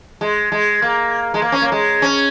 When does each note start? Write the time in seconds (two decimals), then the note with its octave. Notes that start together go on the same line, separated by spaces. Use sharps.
0.21 G#3
0.52 G#3
0.82 A#3
1.34 G#3
1.42 A#3
1.52 C#4
1.62 A#3
1.72 G#3
2.02 C#4